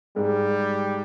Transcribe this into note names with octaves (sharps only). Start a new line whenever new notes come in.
G#2 G3 G#3